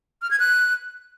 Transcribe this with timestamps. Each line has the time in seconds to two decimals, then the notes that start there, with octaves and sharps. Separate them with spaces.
0.22 F6
0.31 G#6
0.40 F#6